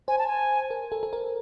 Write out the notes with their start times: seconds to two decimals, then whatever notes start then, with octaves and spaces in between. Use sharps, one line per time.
0.08 C5 G#5
0.18 A5
0.28 G#5
0.70 A#4
0.92 A4
1.03 A4
1.13 A#4